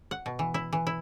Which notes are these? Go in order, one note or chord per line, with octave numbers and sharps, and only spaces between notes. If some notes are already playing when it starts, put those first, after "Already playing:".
F#5
B2
E3
E4
E3
E4